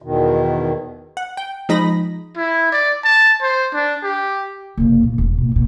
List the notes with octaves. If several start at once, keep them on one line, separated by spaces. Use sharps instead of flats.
E2 B2 D#3
F#5
G5
F3 G#3 D#4 D#5 B5 A#6
E4
D5
A5
C5
D4
G4
F#1 C2
A#2
E1 A1
B2 A#3
F#1 B2